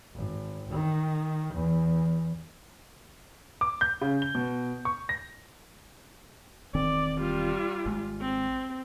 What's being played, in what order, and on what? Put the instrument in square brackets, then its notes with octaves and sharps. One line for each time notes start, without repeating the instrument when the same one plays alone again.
[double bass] G#1
D#3
E2
[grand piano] D6
G6
C#3
G7
B2
C#6
A#6
[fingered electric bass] E1 D#3 C4 [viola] D5
[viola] G3 F4
[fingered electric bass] G#1 G#3
[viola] C4